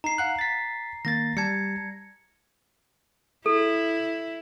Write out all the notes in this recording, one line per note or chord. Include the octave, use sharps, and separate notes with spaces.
D#4 A#5 C7
F5 F#5 F#6
A6 B6
D#3 A#3 A6 A#6
G3 A5 G#6 C#7
E4 A4